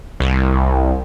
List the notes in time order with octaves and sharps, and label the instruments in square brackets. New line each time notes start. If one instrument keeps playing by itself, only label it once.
[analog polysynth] C2